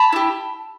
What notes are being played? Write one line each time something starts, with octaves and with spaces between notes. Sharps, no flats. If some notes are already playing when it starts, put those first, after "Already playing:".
Already playing: A5 B5
E4 G4